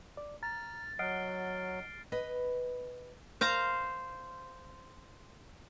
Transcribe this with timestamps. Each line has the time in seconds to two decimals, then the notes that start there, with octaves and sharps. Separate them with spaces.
0.17 D5
0.43 A#5 F6 A6
0.99 F#3 D#5 F#5 F6 C7 D7
2.12 B4 D#5
3.41 C5 F5 A#5